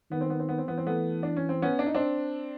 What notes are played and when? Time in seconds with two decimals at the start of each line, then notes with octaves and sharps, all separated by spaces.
0.11 D#3 B3
0.21 C4
0.30 B3
0.40 C4
0.49 B3
0.58 C4
0.68 E3 B3
0.78 C4
0.87 A3 B3
1.23 D4
1.37 C#4
1.49 C4
1.62 B3 C#4
1.79 D4
1.87 D#4
1.95 C4 D4